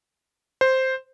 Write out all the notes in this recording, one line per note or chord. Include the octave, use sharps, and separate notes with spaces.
C5